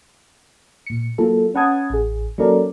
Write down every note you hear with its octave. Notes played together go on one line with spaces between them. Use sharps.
A#2 C#7
F#3 A#3 F4 A4
C#4 B4 F#5 A5 D#6 G#6
A1 G#4
F#3 A#3 C#4 A4 A#4 D5